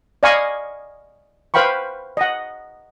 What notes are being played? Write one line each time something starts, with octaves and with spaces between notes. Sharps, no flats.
D5 D#5 F5 G#5 B5 C#6
B4 C5 F5 G5 B5 C#6
D#5 F#5